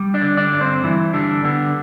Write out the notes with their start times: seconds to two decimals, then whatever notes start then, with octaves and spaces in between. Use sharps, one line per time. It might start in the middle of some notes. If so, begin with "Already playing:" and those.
Already playing: G3
0.14 D4 D5
0.22 D3
0.37 D4 D5
0.53 G2
0.61 C4 C5
0.83 G2 E3 E4
1.13 D3 G3 D4
1.44 D3 B3